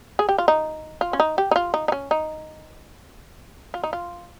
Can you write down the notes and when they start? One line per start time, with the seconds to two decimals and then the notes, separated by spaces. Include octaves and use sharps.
0.19 G#4
0.29 G4
0.38 F4
0.48 D#4
1.01 F4
1.13 C#4
1.20 D#4
1.38 G4
1.51 D#4
1.56 F4
1.74 D#4
1.88 D#4
1.92 C#4
2.11 D#4
3.74 F4
3.84 D#4
3.93 F4